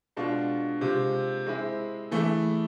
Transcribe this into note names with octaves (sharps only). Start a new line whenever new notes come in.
B2 G#3 D4 F4
C3 G#3 C4 F4
G#3 C4 E4 G#4
E3 A3 E4 G#4